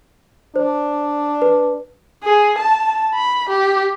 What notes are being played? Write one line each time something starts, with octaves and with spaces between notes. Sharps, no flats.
D4 C5
B4
G#4
A5
B5
G4